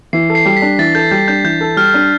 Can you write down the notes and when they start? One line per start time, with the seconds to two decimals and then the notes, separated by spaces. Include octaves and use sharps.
0.13 E3 C7
0.30 A4
0.35 C7
0.45 G3
0.57 B6
0.62 D4
0.79 E3 A6
0.95 A4 G6
1.11 G3 G6
1.28 D4 G6
1.44 E3 G6
1.61 A4
1.77 G3 F6
1.94 D4